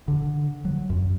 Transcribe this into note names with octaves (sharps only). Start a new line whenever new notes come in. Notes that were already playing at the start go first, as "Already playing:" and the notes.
D3
F#3
F#2